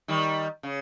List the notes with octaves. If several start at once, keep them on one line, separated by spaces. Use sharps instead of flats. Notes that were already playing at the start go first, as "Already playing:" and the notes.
D#3 G3
C#3